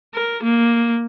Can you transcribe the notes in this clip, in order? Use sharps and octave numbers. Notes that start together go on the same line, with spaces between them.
A#4
A#3